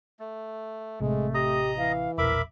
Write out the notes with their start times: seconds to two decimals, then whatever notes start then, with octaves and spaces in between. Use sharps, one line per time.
0.19 A3
1.00 A1 C3 G#3 A3
1.34 G4 D#5 A#5 D#6
1.78 E3 F5
2.18 E1 A#1 A#4 E5 B5 D6